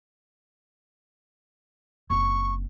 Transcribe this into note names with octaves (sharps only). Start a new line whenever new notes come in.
F#1 C4 C#6